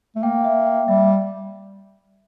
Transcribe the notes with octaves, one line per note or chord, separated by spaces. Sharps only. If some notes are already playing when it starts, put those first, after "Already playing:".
A3
A#3 G5
E5
G5
G3 E5